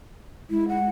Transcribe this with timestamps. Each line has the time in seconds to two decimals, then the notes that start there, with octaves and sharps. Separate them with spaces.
0.50 G#3 E4
0.68 F#5